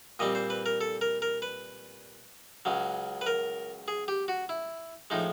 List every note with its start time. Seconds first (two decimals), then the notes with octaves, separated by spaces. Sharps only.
0.19 A#2 G3 C4 D#5
0.35 C5
0.50 B4
0.66 A#4
0.81 A4
1.01 A#4
1.22 A#4
1.42 B4
2.65 C#2 C#3 F#3
3.21 B4
3.26 A#4
3.88 G#4
4.08 G4
4.28 F#4
4.49 E4
5.10 A2 F3 G#3 D#4